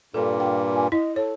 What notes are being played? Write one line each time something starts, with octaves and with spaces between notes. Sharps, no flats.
G2 A#2 D4 A4
F4 G5
G#5
E4 D#5
A4 C#5